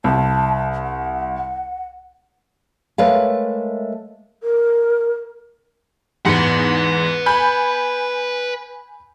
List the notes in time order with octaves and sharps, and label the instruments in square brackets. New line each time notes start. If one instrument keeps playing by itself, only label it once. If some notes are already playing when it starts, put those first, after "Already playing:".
[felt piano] C2 [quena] A5
[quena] F#5
[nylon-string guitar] G#3 A3 A#4 B4 C#5 F5
[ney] A#4
[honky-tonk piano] E2 G#2 C#7 [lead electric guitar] B4 F#5
[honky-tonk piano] G#5 B5 G6